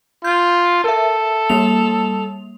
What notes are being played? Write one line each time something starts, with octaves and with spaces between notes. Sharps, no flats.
F4 G6
A4 A#4 E5
G3 A#3 F7